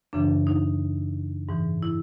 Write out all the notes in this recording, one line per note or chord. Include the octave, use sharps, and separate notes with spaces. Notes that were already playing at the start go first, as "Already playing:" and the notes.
F#2 C#3 E3 D4
D#4
G#2 E3
E4